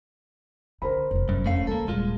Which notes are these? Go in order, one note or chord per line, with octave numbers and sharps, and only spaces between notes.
D3 A#4 C5 B5
F1 E2
G1 F#2
F1 F2 A3 C#4 F5
D3 G#3 A#3 A4
D#1 A#2 G3 G#3 F4